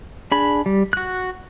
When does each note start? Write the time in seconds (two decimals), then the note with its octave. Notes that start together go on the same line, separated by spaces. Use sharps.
0.32 D4 G#4 B5
0.66 G3
0.93 F#4 F#6